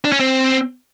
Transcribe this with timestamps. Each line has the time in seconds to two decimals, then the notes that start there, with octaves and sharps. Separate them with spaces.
0.05 D4
0.12 C#4
0.20 C4